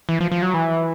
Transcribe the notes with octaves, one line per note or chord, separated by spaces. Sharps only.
E3
F3
F3
F#3
E3